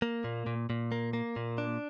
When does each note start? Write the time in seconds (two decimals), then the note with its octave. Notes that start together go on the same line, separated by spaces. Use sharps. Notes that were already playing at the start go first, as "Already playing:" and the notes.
0.02 A#3
0.24 A#2
0.47 A#2
0.70 A#2
0.92 A#3
1.13 A#3
1.36 A#2
1.58 D4